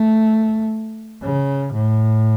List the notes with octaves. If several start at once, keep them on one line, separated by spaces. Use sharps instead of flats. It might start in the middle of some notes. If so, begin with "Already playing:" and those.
Already playing: A3
C#3
A2